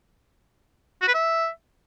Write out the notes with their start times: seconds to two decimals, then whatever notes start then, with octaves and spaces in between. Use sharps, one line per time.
1.02 F#4
1.08 B4
1.14 E5